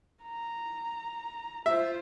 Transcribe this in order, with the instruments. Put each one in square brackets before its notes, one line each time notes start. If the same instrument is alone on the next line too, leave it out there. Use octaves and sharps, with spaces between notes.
[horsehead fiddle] A#5
[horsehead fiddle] F4 C5 [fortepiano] E5